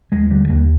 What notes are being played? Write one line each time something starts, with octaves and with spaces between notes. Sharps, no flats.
D#2 G#3
D3 G3
D#2 A#3